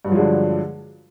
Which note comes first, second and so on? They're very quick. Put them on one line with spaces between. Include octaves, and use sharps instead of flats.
G2 F#3 F3 G#3 D3